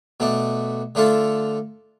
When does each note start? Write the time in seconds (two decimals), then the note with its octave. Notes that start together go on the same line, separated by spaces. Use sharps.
0.20 B2 A3 D4
0.95 D3 A3 D4 F4 A4